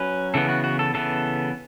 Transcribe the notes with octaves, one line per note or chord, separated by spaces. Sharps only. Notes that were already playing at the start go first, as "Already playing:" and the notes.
Already playing: F#3 C#4 B4
C#3 E3 B3 A4
F#4
F#4
A4
C#3 E3 B3 A4